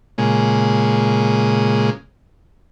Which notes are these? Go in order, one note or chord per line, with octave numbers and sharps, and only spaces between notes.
A#2 C#3 G#3